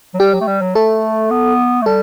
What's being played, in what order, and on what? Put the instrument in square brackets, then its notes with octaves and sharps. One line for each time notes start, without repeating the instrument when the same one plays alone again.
[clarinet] F#3
[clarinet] G3 [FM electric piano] G4
[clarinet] F#3
A3
G3
F#3
[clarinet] A3 [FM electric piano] A4
[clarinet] B3
A3
[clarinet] G3 [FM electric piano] A4